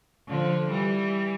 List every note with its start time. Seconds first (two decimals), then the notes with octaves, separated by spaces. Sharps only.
0.28 D3 F3
0.70 E3 G3